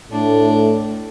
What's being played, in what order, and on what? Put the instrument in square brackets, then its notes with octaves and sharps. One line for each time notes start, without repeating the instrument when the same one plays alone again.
[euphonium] A2 [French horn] A3 [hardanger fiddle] D4